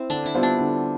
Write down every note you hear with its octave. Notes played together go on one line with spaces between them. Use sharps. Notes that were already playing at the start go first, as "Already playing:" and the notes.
Already playing: C4 E4
D3 D4
E4
G3 B3 F4 C5
D4
D3